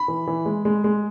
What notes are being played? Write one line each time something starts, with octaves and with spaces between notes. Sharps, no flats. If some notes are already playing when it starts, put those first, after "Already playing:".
Already playing: B5
E3
E3
G#3
G#3
G#3